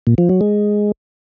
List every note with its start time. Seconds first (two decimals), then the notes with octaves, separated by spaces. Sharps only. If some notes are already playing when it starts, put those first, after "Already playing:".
0.07 A#2
0.18 F3
0.29 F#3
0.41 G#3